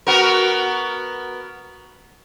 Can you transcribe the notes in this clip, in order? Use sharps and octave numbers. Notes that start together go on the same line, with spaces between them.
B3 F#4 A#4